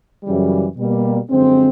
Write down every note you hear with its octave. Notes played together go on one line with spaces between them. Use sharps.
F#2 C#3 E3 G3
B2 G3 A#3
F#2 D3 F3 G#3 C4